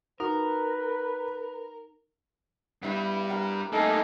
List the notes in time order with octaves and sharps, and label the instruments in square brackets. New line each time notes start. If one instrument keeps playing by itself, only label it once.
[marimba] D#4 [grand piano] F#4 [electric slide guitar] A#4 [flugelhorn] B4
[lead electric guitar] G2 G3 [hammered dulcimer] B3 E4
[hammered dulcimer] G4 A#4 F#5
[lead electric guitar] A3 A#3 [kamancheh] D#4 G#5 [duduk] A4